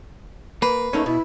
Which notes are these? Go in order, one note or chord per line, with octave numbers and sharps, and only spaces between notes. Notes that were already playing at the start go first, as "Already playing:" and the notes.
A#3 B4
A3 A#3 C#4 D#4
B2 E4